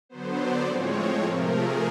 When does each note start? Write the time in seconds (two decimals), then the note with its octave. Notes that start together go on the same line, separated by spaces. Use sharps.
0.09 D3 F#3 B3 C5
0.38 D5
0.66 A2 F3 G#3 C4 C#5
1.23 C3 F3 A3 A#4
1.51 G#4